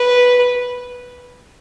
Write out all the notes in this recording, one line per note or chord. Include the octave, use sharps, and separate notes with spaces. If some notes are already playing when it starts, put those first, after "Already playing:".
Already playing: B4